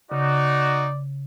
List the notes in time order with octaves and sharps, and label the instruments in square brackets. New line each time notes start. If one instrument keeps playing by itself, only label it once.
[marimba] C#3 [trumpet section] D#4 F#4 [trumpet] D5